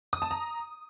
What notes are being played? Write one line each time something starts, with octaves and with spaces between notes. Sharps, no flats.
D#6
A5
A#5